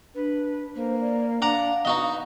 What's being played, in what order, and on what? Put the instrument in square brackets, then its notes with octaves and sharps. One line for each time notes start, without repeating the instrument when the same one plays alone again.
[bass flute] D4 [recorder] B4
[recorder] A#3 [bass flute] C5
[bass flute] D5
[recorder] D4 [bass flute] F5 [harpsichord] F#5 A#5 D6
[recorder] B3 [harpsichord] D#4 F#4 D#5